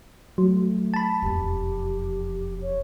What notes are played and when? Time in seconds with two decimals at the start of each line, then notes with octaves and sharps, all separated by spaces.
0.38 F#3 A3
0.94 A5 B5
1.22 E1 F2 G4
2.62 C#5